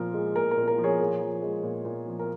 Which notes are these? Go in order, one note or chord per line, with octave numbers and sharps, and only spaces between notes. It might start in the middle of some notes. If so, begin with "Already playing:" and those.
Already playing: A#2 F3 A#4
G#3
A#2 A#4
A#4
A#2
A#4
F3
G#4 C#5
A#2
F3
G#3
A#2
A#2
F3
A#4